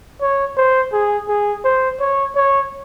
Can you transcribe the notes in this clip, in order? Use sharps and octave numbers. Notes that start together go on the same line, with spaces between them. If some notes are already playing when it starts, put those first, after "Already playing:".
C#5
C5
G#4
G#4
C5
C#5
C#5